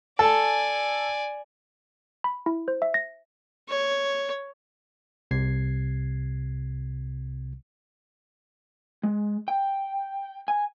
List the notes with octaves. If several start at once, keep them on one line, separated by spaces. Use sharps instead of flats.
A4 D5 G#5
B5
E4
C5
E5
A#6
C#5
C2 C3 G#6 C7
G#3
G5
G#5